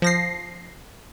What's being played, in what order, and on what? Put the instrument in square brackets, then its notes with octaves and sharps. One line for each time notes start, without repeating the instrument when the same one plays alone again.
[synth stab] F3 A#6 C7